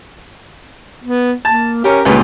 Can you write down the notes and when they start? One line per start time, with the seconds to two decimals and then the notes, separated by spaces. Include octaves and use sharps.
1.04 B3
1.45 A#3 A5
1.84 C#4 G4 A#4
2.05 C#2 G2 A#2 B4